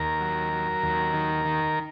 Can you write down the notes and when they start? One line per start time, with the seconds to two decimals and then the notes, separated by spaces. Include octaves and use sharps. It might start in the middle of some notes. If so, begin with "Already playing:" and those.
Already playing: D#2 A#4 A#5
0.21 F#3
0.53 F#3
0.83 D#2
1.14 D#3
1.45 D#3